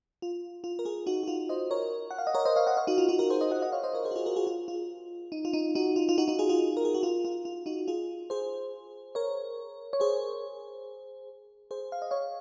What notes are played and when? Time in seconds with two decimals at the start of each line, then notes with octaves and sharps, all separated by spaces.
0.22 F4
0.64 F4
0.79 A#4
0.85 F4 G#4
1.06 D#4 F#4
1.23 F#4
1.28 F4
1.49 C5 D#5
1.71 A#4 C#5
2.11 F#5
2.18 F5
2.27 D#5
2.34 A#4 C#5
2.45 C5 D#5
2.56 C#5 F5
2.67 D#5 F#5
2.77 C#5 F5
2.87 D#4 F#4
2.98 F4
3.09 D#4 F#4
3.19 F#4 A#4
3.30 G#4 C5
3.41 C5 D#5
3.51 D#5 F#5
3.62 D#5 F#5
3.72 C#5 F5
3.83 C5 D#5
3.94 A#4 C#5
4.04 G#4 C5
4.11 F#4
4.15 F4 G#4
4.26 F#4 A#4
4.36 F4 G#4
4.47 F4
4.68 F4
5.32 D#4
5.45 F4
5.53 D#4
5.75 D#4 F#4
5.96 F4
6.09 F4
6.18 D#4 F#4
6.28 D#4 F#4
6.39 F4 G#4
6.49 F4 G#4
6.77 A#4
6.85 G#4
6.94 F#4
7.03 F4
7.25 F4
7.45 F4
7.66 D#4 F#4
7.88 F4 G#4
8.30 G#4 C5
9.15 A#4 C#5
9.93 C#5
10.00 G#4 C5
11.71 G#4 C5
11.92 F5
12.02 D#5
12.11 C#5 F5